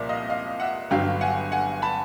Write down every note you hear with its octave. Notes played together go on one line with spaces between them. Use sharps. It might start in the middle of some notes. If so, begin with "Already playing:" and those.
Already playing: C2 A#2 F3 A#3 D5 E5
D#5 F5
D#5 F5
E5 F#5
G1 G2 D3 F#3 F5 G5
F#5 G#5
F#5 G#5
A5 B5